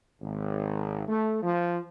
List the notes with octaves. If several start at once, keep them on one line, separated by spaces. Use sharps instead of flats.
G#1
A3
F3